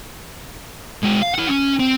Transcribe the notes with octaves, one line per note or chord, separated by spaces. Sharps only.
G#3 F#4
F5
E4 F#5
C#4
C4